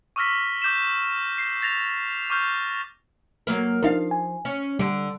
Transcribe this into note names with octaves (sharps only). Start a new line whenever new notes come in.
C#6 D6 E6 F6 A#6 B6
D6 G6 B6 E7
C7
A6 A#6 F7
C#6 D6 F6 G6
F#3 A#3 A#4
F3 D4 D#4 A#4 F5
G#5
C#4
D3 G3 D7